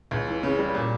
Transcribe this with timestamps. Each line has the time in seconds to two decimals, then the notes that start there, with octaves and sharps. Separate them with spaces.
0.11 C#2
0.27 E3
0.43 C#3
0.59 G3
0.75 A#2